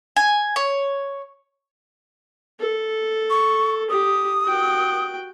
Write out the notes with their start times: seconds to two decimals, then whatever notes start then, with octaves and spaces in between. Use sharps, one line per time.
0.16 G#5
0.56 C#5
2.60 A4
3.30 C#6
3.90 G4 D#6
4.43 F#4 G5